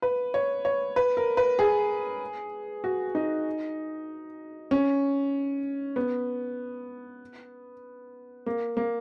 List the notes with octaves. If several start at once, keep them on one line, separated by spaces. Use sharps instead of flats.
B4
C#5
C#5
B4
A#4
B4
G#4
F#4
D#4
C#4
B3
A#3
A#3